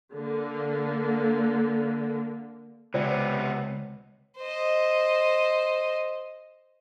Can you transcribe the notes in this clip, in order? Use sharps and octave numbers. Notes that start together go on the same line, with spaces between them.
D3 A#3
C#2 C3 B3 F4 C5 D5
C5 D#5